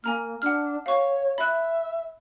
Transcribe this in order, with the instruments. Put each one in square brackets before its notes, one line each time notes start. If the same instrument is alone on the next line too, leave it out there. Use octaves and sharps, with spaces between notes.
[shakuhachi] A#3 [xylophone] G#5 A#5 F6
[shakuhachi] D4 [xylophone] F#5 F6
[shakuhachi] C#5 [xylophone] F5 C#6
[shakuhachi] E5 [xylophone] B5 F#6